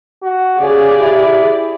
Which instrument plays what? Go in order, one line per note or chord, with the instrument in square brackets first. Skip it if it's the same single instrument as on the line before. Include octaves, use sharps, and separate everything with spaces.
[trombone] F#4
[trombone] C#3 [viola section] G4 G#4 D5
[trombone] E4